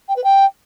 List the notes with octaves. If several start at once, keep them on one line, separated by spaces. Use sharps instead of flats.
G5
B4
G5